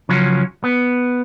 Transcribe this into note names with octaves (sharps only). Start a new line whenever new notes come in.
C#3 F3 F#3 C#4
B3